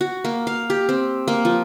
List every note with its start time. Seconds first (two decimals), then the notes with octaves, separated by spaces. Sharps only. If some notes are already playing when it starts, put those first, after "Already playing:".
0.01 F#4
0.25 A#3
0.47 F5
0.70 G4
0.89 C4
1.28 A#3
1.45 F3